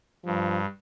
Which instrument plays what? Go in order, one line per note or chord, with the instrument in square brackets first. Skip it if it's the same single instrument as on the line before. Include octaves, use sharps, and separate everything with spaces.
[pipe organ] G2 [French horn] F3